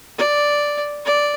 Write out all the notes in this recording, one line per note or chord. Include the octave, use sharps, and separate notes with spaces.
D5
D5